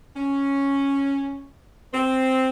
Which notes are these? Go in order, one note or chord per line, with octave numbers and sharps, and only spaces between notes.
C#4
C4